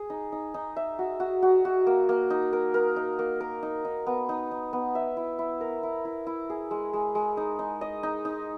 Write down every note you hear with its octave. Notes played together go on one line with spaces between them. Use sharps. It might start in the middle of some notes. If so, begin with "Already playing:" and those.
Already playing: G#4
D#4
D#4
D#4
E5
F#4
F#4
F#4
F#4
A#3
A#3
D#4
A#4
A#4
D#4
A#3
A#4
D#4
D#4
B3
D#4
D#4
B3
E5
E4
E4
A#4
E4
E4
E4
G#4
G#3
G#3
G#3
D#4
D#4
D#5
D#4
D#4